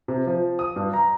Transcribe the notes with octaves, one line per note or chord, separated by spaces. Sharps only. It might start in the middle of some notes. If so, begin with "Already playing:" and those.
C3
F3
D#6
G2
A#5